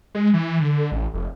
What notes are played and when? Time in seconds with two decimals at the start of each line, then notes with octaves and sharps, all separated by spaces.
0.15 G#3
0.34 E3
0.60 D3
0.92 A1
1.14 F1